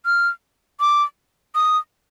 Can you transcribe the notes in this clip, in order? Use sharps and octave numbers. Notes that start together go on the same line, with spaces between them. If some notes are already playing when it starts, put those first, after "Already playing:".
F6
D6
D#6